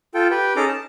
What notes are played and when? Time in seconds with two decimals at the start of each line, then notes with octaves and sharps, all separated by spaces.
0.14 F4 A4 G5
0.31 G4 B4 G5
0.56 C#4 D#4 G#4 A4 A#5 D6
0.69 A5